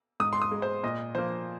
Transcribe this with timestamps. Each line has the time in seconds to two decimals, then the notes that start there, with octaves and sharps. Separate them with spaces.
0.20 G#2 D#6
0.33 C6
0.42 D#6
0.52 G#3
0.62 C5
0.83 A#2 D#5
1.15 F3 A#3 C5